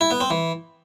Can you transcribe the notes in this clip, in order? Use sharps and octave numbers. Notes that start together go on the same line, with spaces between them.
E4
B3
C4
E3